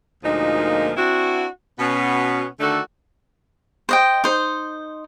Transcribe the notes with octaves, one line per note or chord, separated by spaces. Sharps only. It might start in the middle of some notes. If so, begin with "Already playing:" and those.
D2 A#2 F3 G#3 A#3 D#4
C4 D4 E4 F#4
B2 B3 C#4
D3 D#3 A3 F#4 A4 D5
C5 D#5 G5
D#4 C5